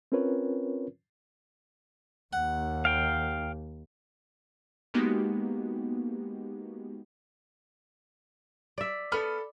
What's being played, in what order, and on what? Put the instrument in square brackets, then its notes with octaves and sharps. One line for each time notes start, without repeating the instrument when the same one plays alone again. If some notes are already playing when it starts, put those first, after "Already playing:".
[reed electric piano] C4 C#4 F4 A#4 B4 C#5
[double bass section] D#2 [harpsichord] F#5
[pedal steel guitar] F5 G5
[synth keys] G#3 A#3 B3 D#4 F#4 G4
[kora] D5 E5
[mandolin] B3 F6 [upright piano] A4 B5